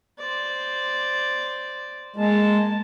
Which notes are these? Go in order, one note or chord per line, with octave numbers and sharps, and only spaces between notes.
C5 D5
G#3 A#3 A5